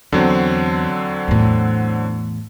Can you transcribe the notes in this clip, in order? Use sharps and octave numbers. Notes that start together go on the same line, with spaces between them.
E2 D3 F#3 C4
E2 A2